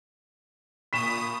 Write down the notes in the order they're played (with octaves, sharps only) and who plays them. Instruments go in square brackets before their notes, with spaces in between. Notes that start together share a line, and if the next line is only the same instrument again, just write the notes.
[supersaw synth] A#2 D#6 [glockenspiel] B5 C#6 [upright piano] B6 E7